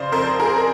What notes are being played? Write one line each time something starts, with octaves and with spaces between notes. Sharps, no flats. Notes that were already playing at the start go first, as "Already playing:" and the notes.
Already playing: C#3 C5 D5
F2 A#4 C5
G#4 A#4
A#4